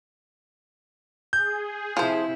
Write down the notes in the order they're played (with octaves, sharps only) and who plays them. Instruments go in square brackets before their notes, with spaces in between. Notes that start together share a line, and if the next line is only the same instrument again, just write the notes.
[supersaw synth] G#4 [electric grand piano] G6
[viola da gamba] C3 E4 [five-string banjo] F3 C5